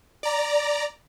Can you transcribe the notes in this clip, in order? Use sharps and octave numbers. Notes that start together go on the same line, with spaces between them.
D5 A#5